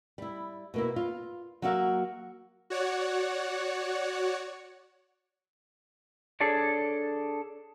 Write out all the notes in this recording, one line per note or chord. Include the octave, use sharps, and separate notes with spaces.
G3 E4
B2 A#3 E4
F4
F#3 A#3 F#4 E5 F5
F#4 C#5 D5 F#5
D4 G#4 A4 C#5 D5